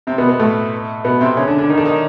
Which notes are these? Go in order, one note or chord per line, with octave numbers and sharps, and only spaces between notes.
C3 C4
B2 B3
B2 B3
A2 A3
B2 B3
C3 C4
C#3 C#4
D3 D4
D3 D4
D#3 D#4
D3 D4
D#3 D#4